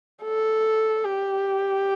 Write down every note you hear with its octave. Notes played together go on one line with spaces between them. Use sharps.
A4
G4